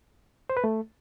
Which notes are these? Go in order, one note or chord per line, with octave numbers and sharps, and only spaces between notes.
C5
B4
A3